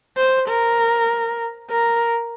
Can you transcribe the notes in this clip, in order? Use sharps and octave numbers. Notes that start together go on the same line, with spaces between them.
C5
A#4
A#4